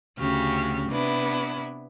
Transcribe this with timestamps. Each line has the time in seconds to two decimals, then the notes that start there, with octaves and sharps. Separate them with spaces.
0.18 D2 C#3 C#4 F#4 G4 F6
0.90 C3 B3 D4 E4 B4